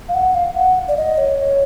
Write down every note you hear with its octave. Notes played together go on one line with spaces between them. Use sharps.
F5
F#5
F5
F#5
D5
D#5
C#5